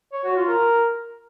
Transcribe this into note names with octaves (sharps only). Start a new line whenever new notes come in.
C#5
F#4
F4
A#4